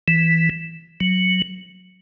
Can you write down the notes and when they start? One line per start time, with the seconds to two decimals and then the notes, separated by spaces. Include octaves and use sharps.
0.08 E3
1.00 F#3